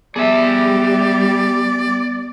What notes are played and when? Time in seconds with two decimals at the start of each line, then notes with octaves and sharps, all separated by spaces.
0.16 G3 B3 G4 G#4 D5 E5